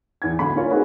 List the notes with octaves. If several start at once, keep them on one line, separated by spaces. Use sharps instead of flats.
E2 G#6
D2 B5
C#4 D4 F4 A#4 C#5
C4 D#4 F#4 G#4 B4 C#5